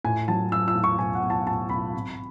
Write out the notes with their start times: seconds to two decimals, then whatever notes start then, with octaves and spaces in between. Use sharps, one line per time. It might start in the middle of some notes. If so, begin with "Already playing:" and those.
0.04 A2 G#5
0.28 F#3 A5
0.52 F#3 E6
0.68 E6
0.75 A2
0.84 C#6
0.99 B1 G#5
1.15 F#5
1.23 B1
1.30 A5
1.47 A2 A5
1.70 B1 B5
1.94 G#1